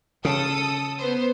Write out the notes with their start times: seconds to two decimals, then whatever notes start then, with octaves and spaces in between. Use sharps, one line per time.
0.25 C#3 A4 D#6
0.98 B3 C5